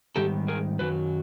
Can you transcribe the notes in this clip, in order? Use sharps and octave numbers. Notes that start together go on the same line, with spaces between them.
G#2 D#3 G3 B3 G4 A4
G#4 A#4
F#2 D#3 F#3 B4